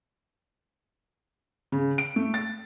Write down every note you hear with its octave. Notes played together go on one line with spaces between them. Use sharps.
C#3
D7
A3
A6